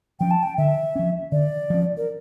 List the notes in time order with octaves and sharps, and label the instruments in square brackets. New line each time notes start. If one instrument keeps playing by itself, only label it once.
[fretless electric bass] F3 C#4 [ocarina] G5
[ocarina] A5
G5
[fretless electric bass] D3 [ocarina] E5
[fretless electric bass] F3 C#4
[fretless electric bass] D3 [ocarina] D5
[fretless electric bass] F3 C#4
[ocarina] A#4